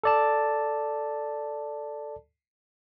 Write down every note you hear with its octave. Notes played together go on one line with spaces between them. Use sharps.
A4 D5 A5